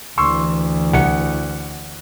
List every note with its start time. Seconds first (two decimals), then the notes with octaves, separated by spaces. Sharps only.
0.18 D2 E3 C6 C#6 E6
0.93 C2 C3 F#5 C#7